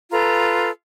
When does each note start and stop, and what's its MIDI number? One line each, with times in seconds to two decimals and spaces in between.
0.11 0.70 65
0.11 0.70 69
0.11 0.70 71
0.11 0.70 82